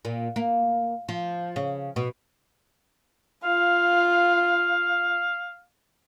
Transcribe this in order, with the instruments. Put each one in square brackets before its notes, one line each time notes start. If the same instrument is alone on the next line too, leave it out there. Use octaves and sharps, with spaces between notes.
[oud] A#2
A#3
F3
C#3
B2
[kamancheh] F4 [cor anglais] F5